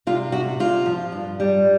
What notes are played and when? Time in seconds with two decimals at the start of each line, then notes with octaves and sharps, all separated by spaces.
0.07 C3 F4
0.32 C3 F#4
0.60 C3 F4
0.86 F3
1.12 G2
1.40 G3